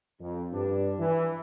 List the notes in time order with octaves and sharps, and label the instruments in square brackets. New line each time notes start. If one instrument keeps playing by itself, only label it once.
[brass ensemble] F2
G2 D4
E3